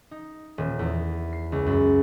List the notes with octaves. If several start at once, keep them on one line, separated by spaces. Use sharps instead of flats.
D#4
D#1
E2
C7
C#2
F#2